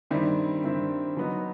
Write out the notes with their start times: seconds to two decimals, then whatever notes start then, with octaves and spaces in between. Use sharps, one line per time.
0.11 G2 D#3 G3 C4 E4
0.64 G2 D#3 G3 C4 E4
1.17 F#3 B3 D#4